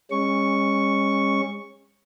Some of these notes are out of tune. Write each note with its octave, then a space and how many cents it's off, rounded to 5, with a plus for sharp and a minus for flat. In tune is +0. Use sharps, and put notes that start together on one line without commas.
G#3 -35 C#4 -20 C#6 +0